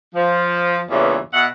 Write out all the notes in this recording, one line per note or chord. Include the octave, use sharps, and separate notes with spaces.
F3
E2 G2 A#2 C#3 E3
B2 E5 F#5